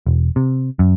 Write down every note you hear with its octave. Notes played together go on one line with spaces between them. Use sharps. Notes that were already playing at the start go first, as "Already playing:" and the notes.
E1
C3
F#2